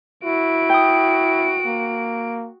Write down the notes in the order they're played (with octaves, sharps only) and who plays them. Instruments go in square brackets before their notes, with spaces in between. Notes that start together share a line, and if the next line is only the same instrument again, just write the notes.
[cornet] E4 [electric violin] F#4 D7
[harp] G5 D#6
[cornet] A#3